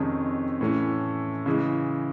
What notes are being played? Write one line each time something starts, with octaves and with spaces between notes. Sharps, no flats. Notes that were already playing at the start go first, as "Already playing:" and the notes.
Already playing: F2 C3 D#3 G#3 C#4
A2 E3 A3 C#4
C#3 E3 G#3